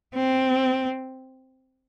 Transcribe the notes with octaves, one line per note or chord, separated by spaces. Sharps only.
C4